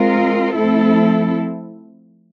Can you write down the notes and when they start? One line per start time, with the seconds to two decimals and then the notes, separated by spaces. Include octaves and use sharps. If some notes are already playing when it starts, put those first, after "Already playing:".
Already playing: G#3 C4 F4 A#4
0.55 F3 A3 C4 E4 A4